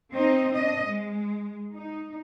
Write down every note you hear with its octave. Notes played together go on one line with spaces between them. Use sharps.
C4 D#4 D#5
D4 D#5
G#3
D#4